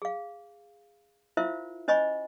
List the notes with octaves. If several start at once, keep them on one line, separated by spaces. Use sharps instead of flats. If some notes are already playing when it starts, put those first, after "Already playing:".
G#4 F5
E4 F4 A#4 C5 E5 F5
C#4 C5 D#5 G#5 B5 C#6